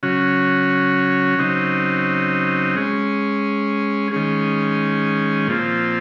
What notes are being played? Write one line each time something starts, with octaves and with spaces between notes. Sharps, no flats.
C#3 F#3 C#4 F#4
C#3 F#3 C4 D#4
G#3 C#4 G#4
D#3 G#3 C#4 G#4
A#2 F3 C4